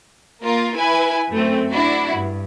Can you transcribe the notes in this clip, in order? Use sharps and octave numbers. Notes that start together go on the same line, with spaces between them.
A#3 F4 A#4
E4 B4 G#5
F#2 A3 C4
D4 E4 F#4
G2